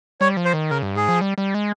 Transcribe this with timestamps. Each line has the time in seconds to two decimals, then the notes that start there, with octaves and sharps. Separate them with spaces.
0.21 G3 C#5
0.37 F3
0.45 C5
0.53 D#3
0.70 C#3 A#4
0.83 G2
0.95 G#2 G#4
1.09 F3
1.21 G3
1.38 G3
1.54 G#3